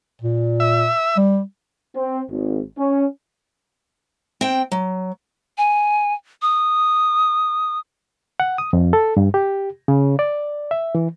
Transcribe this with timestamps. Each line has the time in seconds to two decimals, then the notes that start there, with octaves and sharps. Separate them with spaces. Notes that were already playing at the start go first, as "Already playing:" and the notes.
0.22 A#2
0.60 E5
1.17 G3
1.96 C4
2.30 G#1
2.78 C#4
4.41 C4 G5
4.72 F#3
5.58 G#5
6.42 D#6
8.40 F#5
8.58 D#6
8.73 F2
8.93 A4
9.17 G2
9.34 G4
9.88 C#3
10.19 D5
10.71 E5
10.95 E3